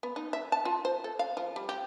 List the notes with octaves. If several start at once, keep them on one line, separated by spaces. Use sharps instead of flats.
B3
D#4
E5
A5
F4
C5
A4
F5
F3
G3
G4